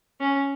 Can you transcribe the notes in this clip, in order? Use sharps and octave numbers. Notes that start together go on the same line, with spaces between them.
C#4